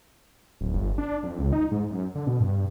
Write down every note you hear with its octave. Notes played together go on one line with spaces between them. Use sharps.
D1
G1
D4
F2
C#2
D#4
G#2
F#2
D3
B2
G2